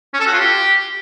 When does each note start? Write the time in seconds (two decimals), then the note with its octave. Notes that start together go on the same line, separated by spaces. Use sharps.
0.14 C#4
0.20 A4
0.26 F#4
0.33 F4
0.39 G4